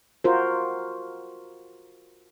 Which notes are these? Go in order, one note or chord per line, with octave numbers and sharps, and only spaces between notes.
F4 F#4 A#4 C5